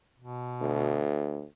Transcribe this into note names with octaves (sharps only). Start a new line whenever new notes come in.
B2
D2